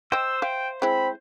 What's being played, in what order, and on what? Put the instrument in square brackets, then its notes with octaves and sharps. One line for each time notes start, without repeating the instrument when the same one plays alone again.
[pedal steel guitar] C5 [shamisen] D#5 G5 [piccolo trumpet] E6
[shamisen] E5 F5 [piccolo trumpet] G5
[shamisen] G#3 E4 [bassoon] C4 [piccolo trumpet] B5